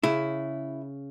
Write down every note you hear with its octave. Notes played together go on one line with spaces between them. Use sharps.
C#3 E4